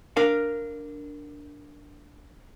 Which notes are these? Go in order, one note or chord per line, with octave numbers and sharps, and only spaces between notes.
D4 A#4 F5